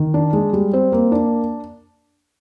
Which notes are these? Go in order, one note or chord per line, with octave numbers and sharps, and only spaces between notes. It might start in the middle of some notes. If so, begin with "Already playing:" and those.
Already playing: D#3
D4
G#3
G3
C4
A#3
D4